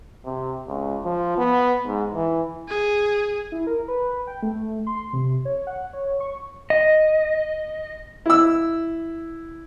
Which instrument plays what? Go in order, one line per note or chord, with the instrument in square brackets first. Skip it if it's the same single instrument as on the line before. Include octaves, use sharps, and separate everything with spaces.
[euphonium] C3
C#2
F3
B3
G#2
E3
[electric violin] G#4
[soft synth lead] E4
A#4
B4
G5
A3
C6
C3
C#5
F#5
C#5
C#6
[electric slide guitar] D#5
[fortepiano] E4 E6